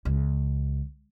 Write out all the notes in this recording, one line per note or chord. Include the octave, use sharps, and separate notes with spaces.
C#2